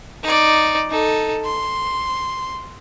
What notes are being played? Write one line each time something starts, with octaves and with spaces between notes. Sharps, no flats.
D#4 D5
D#4 A4
C6